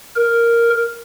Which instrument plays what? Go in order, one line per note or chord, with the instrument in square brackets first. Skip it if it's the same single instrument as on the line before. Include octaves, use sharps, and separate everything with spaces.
[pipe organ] A#4